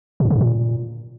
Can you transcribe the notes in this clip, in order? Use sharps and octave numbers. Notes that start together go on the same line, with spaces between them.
B2
G2
C#3
G2
A#2